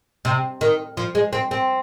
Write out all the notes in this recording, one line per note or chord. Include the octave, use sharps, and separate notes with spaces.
C3
D#3
F3
G#3
C4
C4